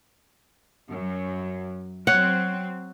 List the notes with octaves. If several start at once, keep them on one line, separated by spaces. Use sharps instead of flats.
F#2
F#3 C4 C#5 F#5